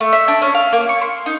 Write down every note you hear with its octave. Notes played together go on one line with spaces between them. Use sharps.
A3
E5
D4
C#4
F5
A#3
C#6
C6
D#4